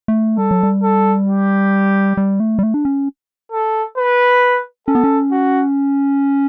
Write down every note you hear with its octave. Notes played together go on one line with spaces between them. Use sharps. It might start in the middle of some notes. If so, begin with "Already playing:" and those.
A3
G3 A4
F#3
G3
A4
G4
G3
A3
G3
A3
D4
C#4
A4
B4
C#4 A4
B3
C#4
F#4